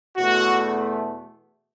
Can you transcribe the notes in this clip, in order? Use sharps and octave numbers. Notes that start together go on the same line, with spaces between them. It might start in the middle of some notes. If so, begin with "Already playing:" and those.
E2 B2 A3 F#4